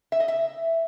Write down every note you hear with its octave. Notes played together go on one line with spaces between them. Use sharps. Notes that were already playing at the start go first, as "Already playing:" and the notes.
E5
D#5
E5